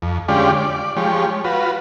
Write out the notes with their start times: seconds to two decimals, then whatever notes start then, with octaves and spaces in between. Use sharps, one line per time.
0.02 F2
0.28 D3 G#3 C#4 F4 G4 D5
0.57 D5
0.97 F3 G#3 G4 C#5
1.44 F4 F#4 B4